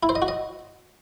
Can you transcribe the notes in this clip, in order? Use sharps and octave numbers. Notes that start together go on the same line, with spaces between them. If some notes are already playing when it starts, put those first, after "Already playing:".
E4
C5
D#5
F#4
D#5